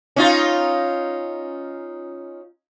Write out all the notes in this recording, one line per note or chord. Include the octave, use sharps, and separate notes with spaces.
C#4 D#4 F4